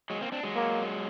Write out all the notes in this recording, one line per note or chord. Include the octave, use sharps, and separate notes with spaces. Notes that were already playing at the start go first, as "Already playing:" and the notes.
F#3 G#3
A#3 C4
C4 D4
F#3 G#3
A#3